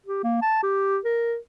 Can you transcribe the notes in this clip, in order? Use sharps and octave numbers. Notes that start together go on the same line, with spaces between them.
G4
A#3
A5
G4
A#4